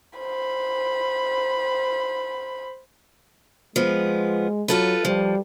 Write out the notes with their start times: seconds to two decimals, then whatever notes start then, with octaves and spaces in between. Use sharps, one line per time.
0.19 C5 B5
3.76 F3 G#3 B3
4.68 F#3 F4 A4 B4
5.05 F3 G3